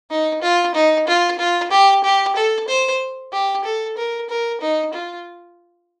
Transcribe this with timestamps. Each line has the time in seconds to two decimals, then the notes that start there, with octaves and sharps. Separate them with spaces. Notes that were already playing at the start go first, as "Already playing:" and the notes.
0.10 D#4
0.42 F4
0.75 D#4
1.07 F4
1.39 F4
1.71 G4
2.04 G4
2.36 A4
2.68 C5
3.33 G4
3.65 A4
3.98 A#4
4.29 A#4
4.61 D#4
4.94 F4